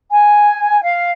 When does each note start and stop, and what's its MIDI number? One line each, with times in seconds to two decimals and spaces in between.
0.10 0.81 80
0.82 1.10 77